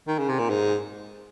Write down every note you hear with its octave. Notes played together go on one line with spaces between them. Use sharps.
D#3
C#3
C3
A#2
G#2